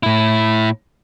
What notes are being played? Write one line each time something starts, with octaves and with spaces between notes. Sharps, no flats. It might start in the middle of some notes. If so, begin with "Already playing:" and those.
A2 E4